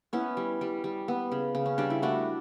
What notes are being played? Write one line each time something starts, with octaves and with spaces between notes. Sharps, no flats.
B3 C#4 E4
G3
G3
G3
B3
C#3
C#3
C#4
G3 D4
E4
A3 D4 F#4